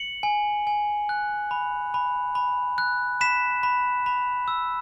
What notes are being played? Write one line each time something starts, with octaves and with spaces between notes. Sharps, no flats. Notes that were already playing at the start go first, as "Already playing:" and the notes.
Already playing: C#7 F#7
G#5
G#5
F#6
B5
B5
B5
F#6
B5 B6 E7
B5
B5
E6